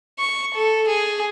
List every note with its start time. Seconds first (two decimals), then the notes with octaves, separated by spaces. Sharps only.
0.19 C#6
0.55 A4
0.89 G#4